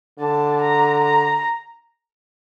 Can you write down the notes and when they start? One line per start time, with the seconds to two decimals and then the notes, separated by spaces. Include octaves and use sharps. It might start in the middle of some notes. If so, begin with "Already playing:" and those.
0.19 D3 A5
0.61 A#5
1.04 A#5